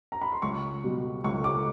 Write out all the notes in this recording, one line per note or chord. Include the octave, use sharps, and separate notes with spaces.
A#5
B5
C6
C#2 C#6
B2 G3
C#2 C#6
D6